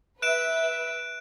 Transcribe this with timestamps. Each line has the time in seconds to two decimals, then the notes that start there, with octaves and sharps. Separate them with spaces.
0.22 B4 E5 F#6 D7 E7